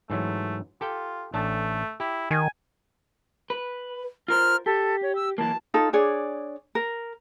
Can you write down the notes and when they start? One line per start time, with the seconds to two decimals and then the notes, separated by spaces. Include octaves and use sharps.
0.10 G#2 E3 F#3 A3
0.81 F4 G4 A4 G5
1.34 A1 A3 D4 A5
2.00 E4 G4
2.31 D#3 G#5
3.50 B4
4.28 F4 A#4 C5 F6
4.66 G4 A4
5.02 C#5
5.15 E6
5.38 E3 F#3 A#3 A5
5.74 D#4 F4 A4
5.93 D4 G#4 C#5 D5
6.75 A#4